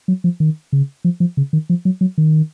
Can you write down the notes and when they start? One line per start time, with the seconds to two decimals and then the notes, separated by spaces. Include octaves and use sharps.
0.08 F#3
0.24 F3
0.40 D#3
0.73 C#3
1.05 F3
1.20 F3
1.37 C#3
1.53 D#3
1.70 F3
1.85 F#3
2.01 F#3
2.18 D#3